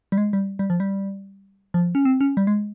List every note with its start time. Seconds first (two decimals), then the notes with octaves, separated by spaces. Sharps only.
0.12 G3
0.18 G#3
0.33 G3
0.59 G3
0.70 F3
0.80 G3
1.74 F3
1.95 C#4
2.05 C4
2.21 C#4
2.37 G3
2.47 G#3